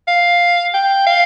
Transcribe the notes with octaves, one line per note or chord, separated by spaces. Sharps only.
F5
G5
F5